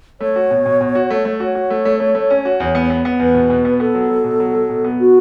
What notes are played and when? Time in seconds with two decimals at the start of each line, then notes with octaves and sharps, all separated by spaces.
0.20 A3 C#5
0.36 F#4
0.51 B2
0.66 B2
0.81 B2
0.95 F#4
1.10 A3
1.25 A3
1.40 F#4 C#5
1.55 F#4
1.70 A3
1.85 A3
2.00 A3
2.15 A3
2.30 C#4
2.45 F#4
2.60 E2
2.75 B3
2.90 B3
3.05 B3
3.20 E2 B4
3.34 B2
3.50 B2
3.65 B3
3.79 B3 A4
3.95 F#3
4.10 F#3
4.24 B2
4.40 F#3
4.54 F#3
4.69 B2
4.84 B3
5.00 F#4